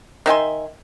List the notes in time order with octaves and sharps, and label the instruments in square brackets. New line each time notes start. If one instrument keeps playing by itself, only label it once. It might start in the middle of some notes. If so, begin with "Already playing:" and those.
[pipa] D#3 E5 G#5 C6